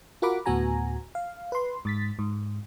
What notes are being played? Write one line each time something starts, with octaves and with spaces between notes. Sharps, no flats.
F4 F#4 A#4 F#5 B5 D6
D2 A2 B3 F#4 G#5 A#5
F5
B4 C6
G#2 A6 B6
G#2